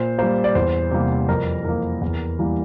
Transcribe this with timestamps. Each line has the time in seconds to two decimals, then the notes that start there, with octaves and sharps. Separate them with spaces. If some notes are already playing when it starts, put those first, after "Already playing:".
Already playing: A#2 C5
0.18 G3 A#3 C5
0.44 D5
0.55 E2 C5
0.91 C3 G3 A#3
1.29 F2 A#4
1.65 E3 A#3 A#4
2.01 E2
2.39 E3 G3 A#3